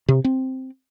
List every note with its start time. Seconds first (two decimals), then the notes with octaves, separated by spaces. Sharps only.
0.08 C3
0.24 C4